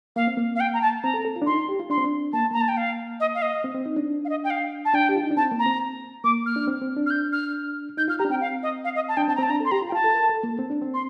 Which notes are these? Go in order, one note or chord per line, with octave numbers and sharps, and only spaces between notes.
A#3 F5
C4
A#3
F5
G5
A#5
A5
C4 A#5
A4
A4
F4
D4
D#4 C6
G4
F4
D4 C6
C4
D4
A#3 A5
A#3 A#5
A5
G5
F5
D#5
F5
D#5
C4
C4
D#4
D4
F5
D#5
G5
F5
A5
D4 G5
G4
F4
D#4
D4
C4 A5
A#3
A#5
C4
A#3 D6
F6
D4
C4
C4
D4
F6
G6
F6
D#4 G6
F4 F6
G4 A#5
D4
C4 G5
F5
D#5
F5
D#5
A5
D4 G5
C4 A5
A#5
C4 A5
D4 A#5
A4 C6
G4 A#5
F4
G5
F4 A5
A4
A#4
A4
A#3
C4
D4
C4
C6